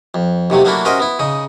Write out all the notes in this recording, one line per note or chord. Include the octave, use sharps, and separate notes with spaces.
F2
D#2 C3 F#3 A3
F#3 A3 A#3 D4 E4 F#4
C#4 F#4 A#4 C5 D#5 E5
B3 E4
C#3 D#4